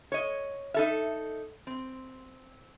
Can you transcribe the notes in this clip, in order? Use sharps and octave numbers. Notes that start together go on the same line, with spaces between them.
C#5 D#5
D#4 A4 E5
C4